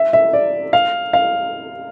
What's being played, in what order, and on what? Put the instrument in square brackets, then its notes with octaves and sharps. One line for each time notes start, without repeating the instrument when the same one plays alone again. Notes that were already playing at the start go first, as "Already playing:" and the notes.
Already playing: [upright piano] E5
E5
D5
F5
F5